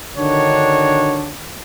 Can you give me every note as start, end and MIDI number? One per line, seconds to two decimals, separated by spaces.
0.16 1.30 50
0.16 1.30 51
0.16 1.30 62
0.16 1.30 66
0.16 1.30 73